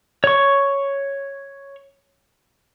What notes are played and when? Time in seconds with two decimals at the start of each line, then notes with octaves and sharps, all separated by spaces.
0.24 C#5 C#6